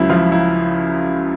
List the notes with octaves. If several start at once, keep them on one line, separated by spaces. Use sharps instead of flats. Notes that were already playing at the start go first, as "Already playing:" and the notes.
Already playing: C#2 C#3 F#3 E4
F3 F4
E4